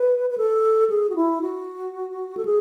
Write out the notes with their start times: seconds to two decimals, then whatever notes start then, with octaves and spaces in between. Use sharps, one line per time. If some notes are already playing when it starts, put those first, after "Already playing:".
Already playing: B4
0.30 B4
0.38 A4
0.90 G#4
1.10 F#4
1.16 E4
1.42 F#4
2.37 A4
2.45 G#4